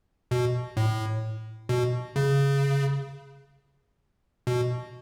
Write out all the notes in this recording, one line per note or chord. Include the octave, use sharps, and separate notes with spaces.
B2
A2
B2
C#3
B2